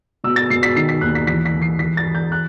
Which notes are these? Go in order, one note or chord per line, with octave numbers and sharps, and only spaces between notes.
B2 E6
A6
B2 C7
B6
D#3 C7
B6
D#2 F#6
B6
E3 B6
B6
E3
C7
E3 B6
A6
E3
G6
F#6